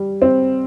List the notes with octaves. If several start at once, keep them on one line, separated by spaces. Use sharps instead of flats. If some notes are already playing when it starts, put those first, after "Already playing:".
Already playing: G3
C4